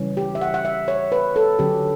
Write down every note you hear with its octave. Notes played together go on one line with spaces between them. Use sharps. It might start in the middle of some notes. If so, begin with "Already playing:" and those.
Already playing: C#3 E3 G3 C#4
G4
E5
F#5
F#5
E5
C#5
B4
A4
D3 F#3 C#4 G4